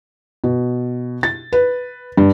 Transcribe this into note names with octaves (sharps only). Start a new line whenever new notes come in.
B2
A6
B4
G2